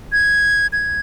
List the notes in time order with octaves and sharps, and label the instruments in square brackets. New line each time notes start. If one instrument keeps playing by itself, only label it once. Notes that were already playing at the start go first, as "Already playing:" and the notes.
[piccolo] G#6
G#6